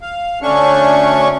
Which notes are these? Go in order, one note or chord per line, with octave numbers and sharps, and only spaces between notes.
F5
D2 A3 C#4 D4 C#6